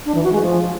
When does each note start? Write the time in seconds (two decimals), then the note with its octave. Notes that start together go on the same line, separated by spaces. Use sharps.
0.06 D4
0.15 E3
0.24 F#4
0.33 G#3
0.42 F3